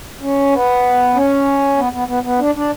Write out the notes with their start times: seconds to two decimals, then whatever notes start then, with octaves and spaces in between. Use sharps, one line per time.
0.21 C#4
0.52 B3
1.15 C#4
1.77 B3
1.93 B3
2.08 B3
2.23 B3
2.39 D4
2.55 D4